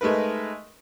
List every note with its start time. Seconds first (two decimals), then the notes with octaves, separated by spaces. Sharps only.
0.01 G#3 A3 D#4 A#4 B4